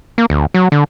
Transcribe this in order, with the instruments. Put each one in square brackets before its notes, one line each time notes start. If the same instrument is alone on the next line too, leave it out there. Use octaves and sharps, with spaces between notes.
[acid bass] A#3
D2
F#3
D3